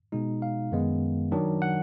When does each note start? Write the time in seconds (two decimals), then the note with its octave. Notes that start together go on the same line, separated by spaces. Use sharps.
0.12 B2 G#3 D#4
0.42 F5
0.72 F#2 D#3 G#3 B3
1.32 D#3 F#3 D4
1.62 F#5